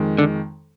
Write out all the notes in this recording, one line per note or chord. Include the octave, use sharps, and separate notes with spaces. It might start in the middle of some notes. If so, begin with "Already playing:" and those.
Already playing: F2 D#3 G#3
D3